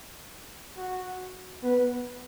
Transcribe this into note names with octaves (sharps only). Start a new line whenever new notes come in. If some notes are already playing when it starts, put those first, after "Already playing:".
F#4
B3 B4